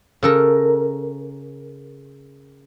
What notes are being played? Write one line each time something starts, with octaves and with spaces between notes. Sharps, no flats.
C#3 A4 A#4